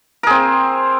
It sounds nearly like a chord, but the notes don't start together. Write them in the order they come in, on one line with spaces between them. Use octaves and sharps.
A#4 G#4 C4